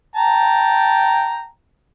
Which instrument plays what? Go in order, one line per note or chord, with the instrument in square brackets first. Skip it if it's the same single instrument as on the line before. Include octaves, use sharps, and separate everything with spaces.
[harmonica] G5 A5 A#5